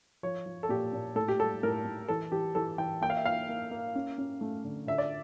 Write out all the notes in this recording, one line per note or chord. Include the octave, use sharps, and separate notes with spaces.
F3 C#5
F3
A4
A#2 G4
A#2
A2 A4
G4
G3 A4
A2 A#4
A2
E3 A4
E3 G4
E3 A4
E3 G5
A#3 G5
F5
E5
A#3 F5
A#3
A#3
C#4
C#4
A3
D3
D3 E5
D5